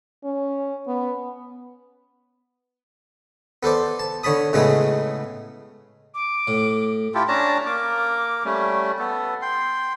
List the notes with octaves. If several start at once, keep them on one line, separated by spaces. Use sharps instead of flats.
C#4
B3
B3 A4 C5 D5
A5
D3 C#5 A5 B5 D#6
A2 C#3 G#3 A3 B3 G#4
D6
A2
E4 F4 G4 A4
C#4 D4 A5 A#5
A#3 D6
G3 A3 C#4
B3 A4
G5 C6